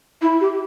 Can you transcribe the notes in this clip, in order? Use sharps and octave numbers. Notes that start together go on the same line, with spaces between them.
E4
G4